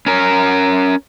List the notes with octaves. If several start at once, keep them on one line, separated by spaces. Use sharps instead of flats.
C#4 A#4